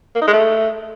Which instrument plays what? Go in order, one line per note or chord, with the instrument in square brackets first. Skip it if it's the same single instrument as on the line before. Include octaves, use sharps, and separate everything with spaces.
[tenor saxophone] A#3
D#4
G#3
A3